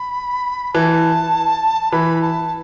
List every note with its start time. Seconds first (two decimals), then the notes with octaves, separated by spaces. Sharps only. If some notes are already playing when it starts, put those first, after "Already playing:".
Already playing: B5
0.74 E3 A5
1.92 E3 B5
2.22 A5